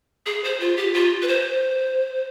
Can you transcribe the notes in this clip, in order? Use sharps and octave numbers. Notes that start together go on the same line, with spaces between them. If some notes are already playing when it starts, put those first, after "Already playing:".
G#4
C5
F4
G4
F4
B4
C5